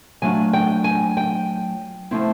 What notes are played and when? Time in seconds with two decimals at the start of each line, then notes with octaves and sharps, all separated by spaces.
0.22 F#3 A3 D4 F4 G#5
0.53 G5
0.84 G#5
1.17 G5
2.11 F3 A3 C4 E4